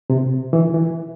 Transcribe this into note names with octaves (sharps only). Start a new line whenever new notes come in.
C3
E3
E3